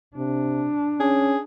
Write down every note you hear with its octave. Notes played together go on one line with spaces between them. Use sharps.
C3 D4
C#4 G#4